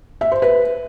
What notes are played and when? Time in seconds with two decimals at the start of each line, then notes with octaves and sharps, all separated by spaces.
0.21 E5
0.32 C5
0.42 B4